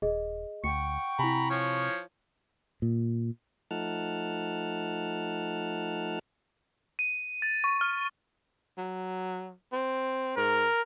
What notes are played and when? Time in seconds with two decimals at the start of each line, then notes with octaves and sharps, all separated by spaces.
0.02 D#1 G#4 D#5
0.64 D2 F#5 G5 C#6 C#7
1.19 C3 E4 G#5 A#5 B5
1.50 F3 C#5
2.82 A#2
3.71 F3 A3 D#4 F#5 A5 F6
6.99 D#7
7.42 A6
7.64 C#6
7.81 F6
8.78 F#3
9.72 C4
10.37 G#2 A#4